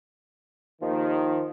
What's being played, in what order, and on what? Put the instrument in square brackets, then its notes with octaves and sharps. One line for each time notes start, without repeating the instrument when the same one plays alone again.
[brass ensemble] D#2 D#3 [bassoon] F3